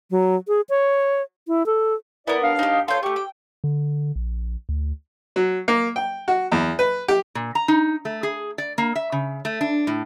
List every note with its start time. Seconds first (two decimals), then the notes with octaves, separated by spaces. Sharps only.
0.11 F#3
0.48 G#4
0.69 C#5
1.48 E4
1.66 A4
2.27 B3 E4 A#4 D5
2.42 D#2 D4 F5
2.59 D#4 G4
2.88 F4 A4 C#5 G5 C6
3.03 A3 G4 C#6
3.16 G5
3.64 D3
4.16 A#1
4.69 D2
5.36 F#3
5.68 A#3
5.96 G5
6.28 F#4
6.52 E2
6.79 B4
7.08 G4
7.35 A#2
7.55 A#5
7.68 D#4
8.05 A3
8.23 G#4
8.58 D5
8.78 A#3
8.95 E5
9.12 C#3
9.45 A3
9.61 D4
9.87 A2